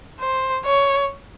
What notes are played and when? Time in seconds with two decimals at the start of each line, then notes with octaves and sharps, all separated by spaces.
0.20 C5
0.65 C#5